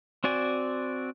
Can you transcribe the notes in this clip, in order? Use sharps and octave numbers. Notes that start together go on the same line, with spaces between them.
C4 F#4 D5 G#5